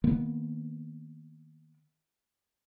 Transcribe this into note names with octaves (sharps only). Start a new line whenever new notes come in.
D#3 A#3 B3